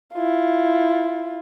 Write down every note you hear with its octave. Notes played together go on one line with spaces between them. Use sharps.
E4 F4